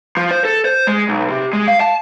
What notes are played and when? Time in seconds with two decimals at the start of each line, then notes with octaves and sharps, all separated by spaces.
0.17 F3
0.31 C5
0.45 A4
0.65 C5
0.87 G#3
1.09 B1
1.30 C3
1.53 G#3
1.68 F5
1.80 A5